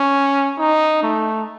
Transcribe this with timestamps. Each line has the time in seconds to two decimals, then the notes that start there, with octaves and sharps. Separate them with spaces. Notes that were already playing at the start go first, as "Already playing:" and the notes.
Already playing: C#4
0.58 D#4
1.03 A3